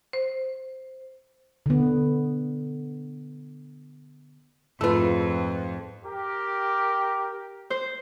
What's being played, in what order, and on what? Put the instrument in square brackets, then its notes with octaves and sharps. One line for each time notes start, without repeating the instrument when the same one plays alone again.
[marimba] C5
[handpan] D3 B3
[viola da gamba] F2 [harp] G#2 [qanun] A3 F4 [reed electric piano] B4 E6
[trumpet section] G4 A#4
[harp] C5